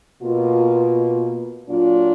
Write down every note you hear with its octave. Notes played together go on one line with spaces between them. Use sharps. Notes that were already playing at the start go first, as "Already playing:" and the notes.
B2 A#3 F4
A#2 F#3 D4 F4